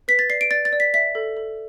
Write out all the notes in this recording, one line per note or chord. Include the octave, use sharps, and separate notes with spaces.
B4 B6
A6
D5 C7
D7
D5 A6
A6
D5
B6
E5 B6
A4
A4